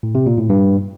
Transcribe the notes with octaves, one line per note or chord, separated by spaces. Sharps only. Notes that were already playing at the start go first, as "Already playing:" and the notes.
A2
C3
A#2
A2
G2